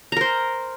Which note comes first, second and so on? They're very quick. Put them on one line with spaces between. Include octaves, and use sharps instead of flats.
A#5 A#4 C5